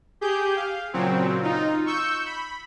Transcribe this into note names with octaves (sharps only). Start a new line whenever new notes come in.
G4 G#4 G6
F5
A#2 C#3 F#3 C4
D#4 F4
C#6 E6 G6
B5